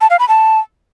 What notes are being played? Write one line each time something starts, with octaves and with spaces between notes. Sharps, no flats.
A5
F5
B5
A5